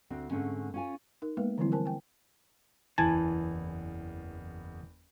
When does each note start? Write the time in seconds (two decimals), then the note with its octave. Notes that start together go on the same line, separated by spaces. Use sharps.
0.10 D2 C4 D4
0.31 G#2 D3 A3 C4 C#4
0.74 C#4 F4 G#5
1.22 D#4 A#4
1.37 G#3 A#3 B3 B4 F5
1.58 D3 E3 F3 G3 C4 E4
1.72 A#4 C5 G#5 A5
1.85 G5 G#5
2.98 F#1 E2 E3 G#5 A5 F#7